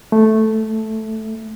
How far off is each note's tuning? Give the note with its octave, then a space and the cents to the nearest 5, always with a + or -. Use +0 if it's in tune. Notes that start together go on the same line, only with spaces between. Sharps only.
A3 -5